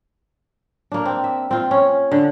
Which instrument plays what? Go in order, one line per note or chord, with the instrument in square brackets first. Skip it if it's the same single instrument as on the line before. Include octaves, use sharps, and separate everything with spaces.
[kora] A#3 D4
C4
E5
C4 F4
C#4
D3